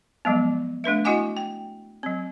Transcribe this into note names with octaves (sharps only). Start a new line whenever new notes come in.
F3 F#3 G#3 B3
A3 D4 B4 E5
E4 F#4 D#5 F#5 G#5 D6
G5
F#3 C4